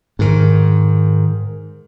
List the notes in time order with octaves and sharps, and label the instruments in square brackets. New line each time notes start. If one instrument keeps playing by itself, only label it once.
[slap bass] G#2 D#3